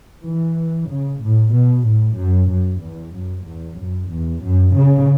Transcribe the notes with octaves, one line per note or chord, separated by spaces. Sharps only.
E3
C#3
A2
B2
A2
F#2
F#2
E2
F#2
E2
F#2
E2
F#2
C#3